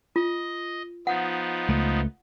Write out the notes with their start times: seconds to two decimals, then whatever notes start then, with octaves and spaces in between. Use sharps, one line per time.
0.16 F4 D#5
1.07 F3 B3 D#4 F#5
1.68 C#2 A3